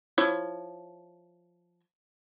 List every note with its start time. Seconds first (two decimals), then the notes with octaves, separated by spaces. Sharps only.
0.18 F3 E4 C#5